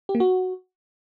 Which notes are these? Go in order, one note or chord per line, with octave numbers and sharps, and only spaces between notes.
G4
A#3
F#4